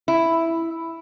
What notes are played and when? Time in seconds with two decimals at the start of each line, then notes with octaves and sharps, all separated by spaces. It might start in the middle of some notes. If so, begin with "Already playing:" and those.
0.08 E4